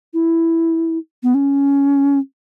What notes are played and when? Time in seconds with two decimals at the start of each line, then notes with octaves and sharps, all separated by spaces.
0.14 E4
1.23 B3
1.34 C#4